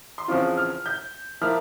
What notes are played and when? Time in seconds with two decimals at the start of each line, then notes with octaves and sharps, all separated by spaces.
0.18 C6
0.28 E2 C#3 F3 C4 F4 C#6
0.57 F6
0.86 G6
1.41 F3 A#3 E4 F6